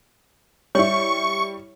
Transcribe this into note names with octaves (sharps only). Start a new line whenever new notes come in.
G3 E4 C#5 C#6